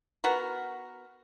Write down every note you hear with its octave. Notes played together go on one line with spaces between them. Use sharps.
B3 F#4 A#4